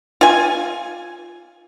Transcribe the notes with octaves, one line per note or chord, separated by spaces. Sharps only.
F4 G#5